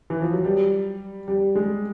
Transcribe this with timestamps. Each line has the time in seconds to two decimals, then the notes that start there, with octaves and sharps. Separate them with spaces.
0.10 E3
0.22 F3
0.33 F#3
0.44 G3
1.28 G3
1.55 G#3